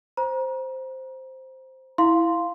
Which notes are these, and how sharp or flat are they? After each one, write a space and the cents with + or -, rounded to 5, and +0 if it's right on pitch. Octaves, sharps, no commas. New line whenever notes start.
C5 +0 A#5 +35
E4 +0 F5 +0 C6 -5